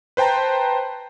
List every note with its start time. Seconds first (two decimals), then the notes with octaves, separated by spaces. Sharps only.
0.17 B4 C5 G5 A5 A#5